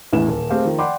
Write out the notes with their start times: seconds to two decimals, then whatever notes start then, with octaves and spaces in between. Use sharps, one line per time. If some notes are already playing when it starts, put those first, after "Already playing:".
0.12 A1 E2 A2 E4 B4 E7
0.27 D#1
0.50 A3 C4 G4 G#4 F5
0.65 D#3 F3
0.79 D5 F#5 G5 B5 C6 D6